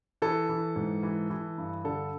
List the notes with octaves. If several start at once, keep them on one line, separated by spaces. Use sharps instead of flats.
E3 A4
E3
G#2
E3
E3
G2
D3 A4